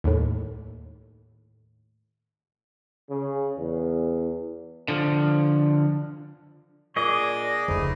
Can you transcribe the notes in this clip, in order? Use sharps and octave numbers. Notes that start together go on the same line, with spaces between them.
D#2 A2
C#3
E2
D3 F3
A#2 D4 G#4 D5 D#5 D6
F1 C#2 G#2 A3 D#4 B4